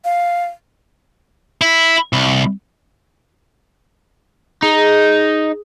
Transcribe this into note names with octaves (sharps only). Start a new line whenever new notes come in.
F5
E4
C2
D#4 G#4